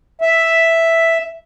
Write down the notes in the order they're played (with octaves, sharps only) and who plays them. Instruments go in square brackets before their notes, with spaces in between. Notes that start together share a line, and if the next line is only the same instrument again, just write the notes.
[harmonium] E5